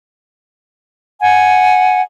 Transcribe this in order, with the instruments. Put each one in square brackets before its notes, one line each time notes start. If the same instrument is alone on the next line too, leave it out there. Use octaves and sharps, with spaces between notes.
[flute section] F#5 G#5